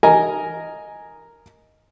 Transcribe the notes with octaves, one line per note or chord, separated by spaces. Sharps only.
A#4 D#5 G#5 A#5